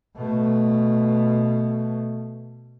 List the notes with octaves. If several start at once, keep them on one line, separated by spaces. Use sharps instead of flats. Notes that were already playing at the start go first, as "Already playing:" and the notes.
B2 A3